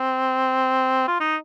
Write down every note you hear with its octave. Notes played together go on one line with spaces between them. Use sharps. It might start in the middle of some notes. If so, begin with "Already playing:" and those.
Already playing: C4
F4
D#4